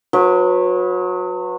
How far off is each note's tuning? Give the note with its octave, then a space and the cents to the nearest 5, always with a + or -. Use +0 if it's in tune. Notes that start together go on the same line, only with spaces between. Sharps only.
F#3 -30 B4 -5